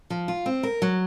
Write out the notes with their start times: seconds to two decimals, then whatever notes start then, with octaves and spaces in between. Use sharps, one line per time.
0.10 F3
0.28 F4
0.46 C4
0.63 A#4
0.82 F#3